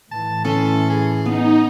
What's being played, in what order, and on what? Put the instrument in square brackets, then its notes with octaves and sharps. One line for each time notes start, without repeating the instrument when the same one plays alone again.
[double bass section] A2 E3 [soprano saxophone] A5
[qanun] C#4 B5 C6 [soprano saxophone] A4
[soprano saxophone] G#4
[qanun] B3 [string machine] D#4